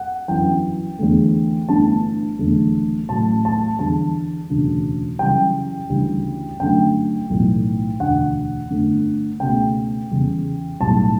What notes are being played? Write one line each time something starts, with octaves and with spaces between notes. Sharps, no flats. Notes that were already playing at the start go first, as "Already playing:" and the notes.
Already playing: F#5
G1 F#2 E3 G5
E2 D3 A3
G1 G2 E3 A3 A5
F#1 E2 D3 A3
A1 A2 F#3 A3 A5
A5
E2 D3 G3 A5
E1 D2 C#3
F#2 C#3 E3 G3 G5
D2 C#3 E3 G3
G1 F#2 D3 A3 G5
B1 A2 E3 A3
E1 D2 D3 F#5
G1 G2 D3 A3
C#2 B2 A3 G5
E2 C#3 G3
B1 A2 G3 A5